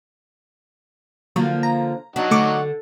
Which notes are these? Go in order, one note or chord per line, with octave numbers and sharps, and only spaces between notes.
D3 F3 F#3 A#3
A#5
F#3 D4 D#4 F#4
D3 A3 C#6 D6